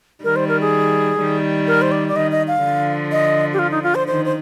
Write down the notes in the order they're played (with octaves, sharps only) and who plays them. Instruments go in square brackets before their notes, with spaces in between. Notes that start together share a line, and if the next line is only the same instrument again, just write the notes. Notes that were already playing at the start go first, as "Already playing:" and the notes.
[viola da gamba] D#3 G3 [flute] A#4
[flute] C5
A#4
G#4
[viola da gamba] D#3 G3
[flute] A#4
C5
D5
D5
[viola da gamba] D#3 [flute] D#5
[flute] D#5
F5
[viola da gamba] D3 F3
[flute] D#5
G4
F4
D#4
F4
C5
[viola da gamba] D#3 [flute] C5
[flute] C5